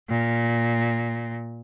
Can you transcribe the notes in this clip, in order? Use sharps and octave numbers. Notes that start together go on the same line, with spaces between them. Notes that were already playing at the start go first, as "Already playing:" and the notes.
A#2